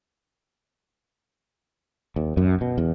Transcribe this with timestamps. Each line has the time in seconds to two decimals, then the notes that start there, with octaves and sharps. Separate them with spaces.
2.16 D#2
2.37 F#2
2.61 B2
2.78 E2